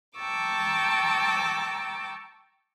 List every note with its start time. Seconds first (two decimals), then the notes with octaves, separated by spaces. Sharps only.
0.17 G5 A5 A#5 C#6 D6 E6